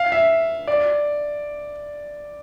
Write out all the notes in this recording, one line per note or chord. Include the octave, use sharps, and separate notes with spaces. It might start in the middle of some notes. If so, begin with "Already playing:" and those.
Already playing: F5
E5
D5